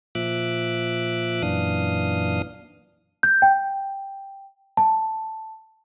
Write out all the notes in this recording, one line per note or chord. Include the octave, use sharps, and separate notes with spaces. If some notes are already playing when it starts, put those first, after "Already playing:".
A#2 F3 E5 D6 F#6
F#2 A#2 E3 D4 F5 D#6
G6
G5
A5